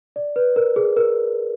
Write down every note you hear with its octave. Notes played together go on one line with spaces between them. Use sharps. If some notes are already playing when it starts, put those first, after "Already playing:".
D5
B4
A#4
G#4
A#4